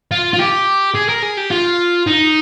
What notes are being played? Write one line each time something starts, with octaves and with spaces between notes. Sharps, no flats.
F4
F4
G4
G#4
A#4
G#4
G4
F4
D#4